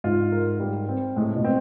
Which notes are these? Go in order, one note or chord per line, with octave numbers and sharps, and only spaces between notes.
G#2 F4
A#4
G3
C4
A2 G#3
B2
C4